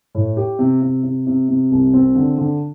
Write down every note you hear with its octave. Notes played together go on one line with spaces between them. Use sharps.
A2
G4
C3
C3
C3
C3
C3
C2
C4
D3
D3